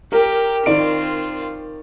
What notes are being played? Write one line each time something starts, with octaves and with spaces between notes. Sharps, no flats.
G4 A#4
D#3 C4 F4 D5 D7